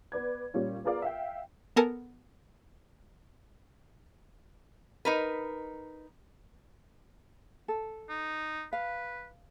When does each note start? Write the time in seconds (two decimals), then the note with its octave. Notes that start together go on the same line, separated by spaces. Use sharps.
0.12 B3 B4 D5 G#6
0.54 A#2 G3 C#4 F4
0.84 B3 F4 G#4 A#4 D5 F5
1.02 E5 F5 G5
1.76 B3 A4 A#4 G#5 A5
5.05 D#4 A#4 B4
7.68 A4
8.09 D#4
8.73 B4 F5